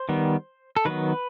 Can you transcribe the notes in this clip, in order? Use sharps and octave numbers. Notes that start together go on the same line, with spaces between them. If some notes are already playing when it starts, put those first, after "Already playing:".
Already playing: C5
D#3 G3 B3
A4
D#3 F#3 B3 B4